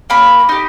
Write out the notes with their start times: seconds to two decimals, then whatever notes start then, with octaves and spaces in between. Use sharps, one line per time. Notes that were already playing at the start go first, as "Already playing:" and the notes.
0.10 A#3 B5
0.49 D#4 G4